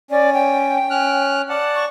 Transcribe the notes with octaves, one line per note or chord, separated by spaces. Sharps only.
C#4 D5
G5
C#4 F6 F#6
D5 F#5 A5
C#6